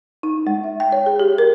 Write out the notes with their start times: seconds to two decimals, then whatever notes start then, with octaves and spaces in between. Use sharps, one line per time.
0.23 D#4
0.47 G#3
0.64 E5
0.80 G5
0.92 C#5
1.06 G#4
1.20 G4
1.38 A#4